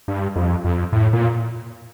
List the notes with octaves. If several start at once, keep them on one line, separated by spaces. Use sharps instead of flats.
G2
F2
F2
A2
A#2